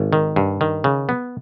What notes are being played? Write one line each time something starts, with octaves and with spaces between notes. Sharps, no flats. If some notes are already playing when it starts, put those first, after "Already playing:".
Already playing: G#1
D#3
G2
D#3
C#3
B3